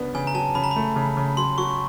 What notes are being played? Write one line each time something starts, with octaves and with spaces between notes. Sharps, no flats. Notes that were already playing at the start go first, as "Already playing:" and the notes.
Already playing: C#3 B3 D4
C#3 G#5
A#5
F#3 A5
C#3 B5
A#5
A3 B5
C#3
C#3
F#3 C6
F#3 C#6